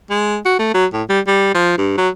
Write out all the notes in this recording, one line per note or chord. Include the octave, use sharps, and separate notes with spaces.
G#3
F#4
A3
F#3
A2
G3
G3
F3
G2
F#3